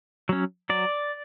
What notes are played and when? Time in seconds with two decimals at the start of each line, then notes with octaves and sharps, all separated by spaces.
0.29 F#3 C#4
0.70 F#3 D5